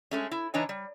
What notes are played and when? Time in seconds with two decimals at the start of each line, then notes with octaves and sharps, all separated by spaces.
0.11 G#3 A3 C#4
0.31 E4
0.54 E3 D4 D#4 C#5 G#5
0.69 G3